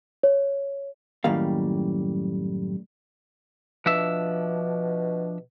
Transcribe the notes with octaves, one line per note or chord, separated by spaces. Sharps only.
C#5
F#2 A2 D#3 G3 A#3 F5
B2 F3 D4 E5